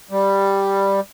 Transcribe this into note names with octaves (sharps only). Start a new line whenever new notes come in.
G3